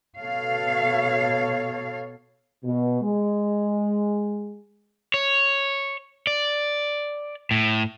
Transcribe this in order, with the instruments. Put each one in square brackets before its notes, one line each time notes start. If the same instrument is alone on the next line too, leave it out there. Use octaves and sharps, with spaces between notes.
[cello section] B2 A4 C#5 F5
[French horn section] B2
G#3
[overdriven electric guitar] C#5
D5
A2